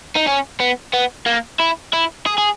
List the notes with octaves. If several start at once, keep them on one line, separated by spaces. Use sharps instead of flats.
D#4
C#4
B3
B3
A#3
E4
E4
G#4
G#4